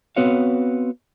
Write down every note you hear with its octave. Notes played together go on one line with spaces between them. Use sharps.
B3 C4 F#4 B4 C#5 F5